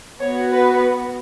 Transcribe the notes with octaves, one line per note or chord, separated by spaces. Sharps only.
B3 F#4 C#5
B4